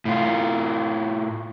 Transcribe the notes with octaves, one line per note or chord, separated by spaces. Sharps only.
A2 F4